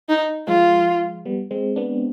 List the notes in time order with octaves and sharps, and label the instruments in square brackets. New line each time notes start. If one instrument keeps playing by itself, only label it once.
[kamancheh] D#4
[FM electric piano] F3 G#3 [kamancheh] F4
[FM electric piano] G3 B3
G#3 C4
B3 D4